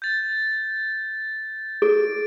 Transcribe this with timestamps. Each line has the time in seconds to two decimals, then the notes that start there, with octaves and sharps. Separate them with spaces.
0.02 G6 A6
1.82 G#4 D7